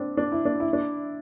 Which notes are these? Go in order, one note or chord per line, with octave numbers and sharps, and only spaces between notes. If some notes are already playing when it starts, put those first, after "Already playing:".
Already playing: C4 D4
D4
E4
D4
E4
D4